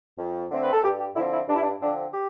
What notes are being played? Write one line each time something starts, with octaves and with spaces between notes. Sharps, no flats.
F2
D3 A3 C4
B4
A4
G2 G4
G4
D3 F3 C4 E4
E4
G2 D4
E4
D4
D3 F3 C4 D4
G4